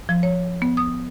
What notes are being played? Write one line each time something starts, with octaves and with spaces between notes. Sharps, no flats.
F3
C#5
B3
D#6